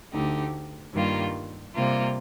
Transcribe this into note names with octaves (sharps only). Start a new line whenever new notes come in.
D2 D3 A3 D#4 G4
G2 D#3 G3 A#3 F4
C3 G3 A#3 F4